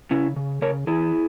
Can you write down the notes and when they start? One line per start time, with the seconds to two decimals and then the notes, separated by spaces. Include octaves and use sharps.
0.11 C#3 C#4 E4
0.36 C#3
0.62 C#3 A#4 C#5
0.87 E3 E4 G#4